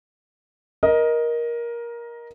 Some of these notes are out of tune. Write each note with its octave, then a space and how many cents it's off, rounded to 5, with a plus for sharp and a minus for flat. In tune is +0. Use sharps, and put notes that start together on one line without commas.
A#4 +15 D#5 +5